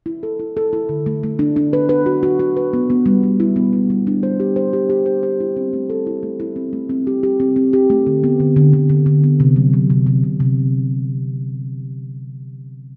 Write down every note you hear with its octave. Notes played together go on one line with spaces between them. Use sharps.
E4
A4
E4
A4
E4
D3
A3
A3
D4
D4
B4
B4
F#4
F#4
F#4
B4
B3
B3
G3
B3
E4
B3
E4
G3
D4
C5
G4
C5
G4
G4
C5
C5
E4
C4
A3
A4
E4
A3
E4
C4
A3
C4
G4
G4
C4
C4
G4
A3
D3
B3
D3
D3
D3
D3
D3
B3
C3
F#3
F#3
C3
C3
C3
C3